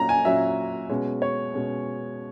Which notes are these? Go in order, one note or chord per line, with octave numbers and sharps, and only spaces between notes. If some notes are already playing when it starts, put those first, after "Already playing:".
Already playing: A#2 F#3 C#4 A#5
G#5
A#2 F#3 C#4 E5
B2 G#3 C#4
C#5
B2 G#3 C#4